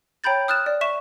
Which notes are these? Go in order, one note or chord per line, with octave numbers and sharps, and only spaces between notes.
C#5 G5 A#5 B5 G6 A6
D#6 F6 F#6 A6 E7
D5
E5 C#6 E7